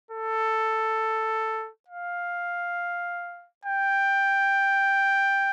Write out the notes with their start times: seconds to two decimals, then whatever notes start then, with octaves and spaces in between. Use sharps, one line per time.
0.11 A4
1.88 F5
3.65 G5